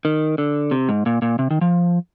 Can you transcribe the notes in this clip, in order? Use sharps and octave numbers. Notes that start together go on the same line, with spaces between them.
D#3
D3
C3
G#2
A#2
A#2
C3
D#3
F3